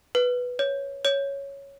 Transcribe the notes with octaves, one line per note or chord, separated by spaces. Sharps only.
B4
C#5
C#5